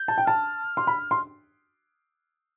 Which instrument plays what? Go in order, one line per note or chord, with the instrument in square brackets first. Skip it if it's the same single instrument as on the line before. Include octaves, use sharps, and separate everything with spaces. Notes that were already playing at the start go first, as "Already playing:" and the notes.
Already playing: [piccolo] G6
[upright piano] A5
G5
[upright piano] A5 [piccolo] F6
[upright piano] C6
B5
C6